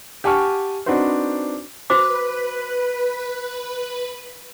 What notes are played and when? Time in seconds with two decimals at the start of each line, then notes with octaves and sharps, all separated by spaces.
0.24 G4 F#5 G#5 A5 C#6 F6
0.86 C4 D4 D#4 F#4 B4 C5
1.90 F#4 B4 C5 D6